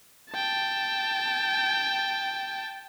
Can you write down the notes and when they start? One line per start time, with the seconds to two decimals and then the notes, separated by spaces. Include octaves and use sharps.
0.31 G5 A5